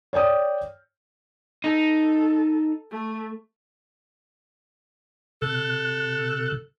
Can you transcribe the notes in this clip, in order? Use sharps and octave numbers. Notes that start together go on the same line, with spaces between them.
C#5 D5 G5 D#6
D#4 A4
A3
C3 A4 F#6